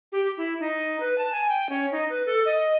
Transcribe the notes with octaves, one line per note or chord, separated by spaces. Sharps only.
G4
E4
D#4
B4
A5
G#5
G5
C#4
D#4
B4
A4
D#5